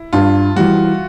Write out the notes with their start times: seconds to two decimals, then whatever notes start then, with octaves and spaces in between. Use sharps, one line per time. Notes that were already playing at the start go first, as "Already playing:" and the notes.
Already playing: E4
0.13 G2 F4
0.56 E3 G3 F#4